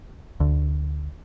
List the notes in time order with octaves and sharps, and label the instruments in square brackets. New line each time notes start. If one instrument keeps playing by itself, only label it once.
[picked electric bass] D2